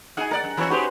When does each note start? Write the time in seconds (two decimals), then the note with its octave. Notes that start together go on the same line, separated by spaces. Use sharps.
0.17 D#4 F#4 G#4 F#5 G#5
0.31 A3 A#4 D5 F#5
0.44 F#2
0.57 E3 C#4 E4 F#4 B4
0.70 G#3 D#4 F#4 G4 B4 C5